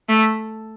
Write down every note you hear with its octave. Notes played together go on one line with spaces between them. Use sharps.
A3